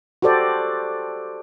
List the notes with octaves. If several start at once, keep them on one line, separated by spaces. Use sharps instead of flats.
F#4 G4 A4 C5 D5